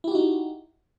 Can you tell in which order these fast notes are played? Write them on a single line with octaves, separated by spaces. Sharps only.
E4 G4 F#4 D#4